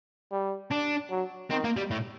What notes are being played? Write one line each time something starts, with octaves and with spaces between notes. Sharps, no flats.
G3
D4
F#3
D#3 C4
A#3
G3
A2